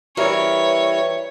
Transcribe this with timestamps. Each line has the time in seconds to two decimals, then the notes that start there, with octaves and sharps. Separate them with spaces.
0.17 E3 G3 A#4 C#5